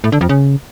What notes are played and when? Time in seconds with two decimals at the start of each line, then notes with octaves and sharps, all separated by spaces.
0.04 A2
0.12 D3
0.21 F2
0.29 C#3